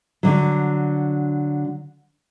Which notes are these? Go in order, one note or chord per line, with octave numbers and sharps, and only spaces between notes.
D3 F#3